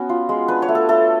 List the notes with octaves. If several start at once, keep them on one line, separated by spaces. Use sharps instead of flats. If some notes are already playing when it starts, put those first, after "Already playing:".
Already playing: B3 C#4 F#4
F4
G#3
D4 B4
C#5
A3
A4
A3 A4